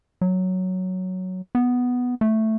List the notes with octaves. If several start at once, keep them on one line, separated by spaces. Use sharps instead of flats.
F#3
B3
A3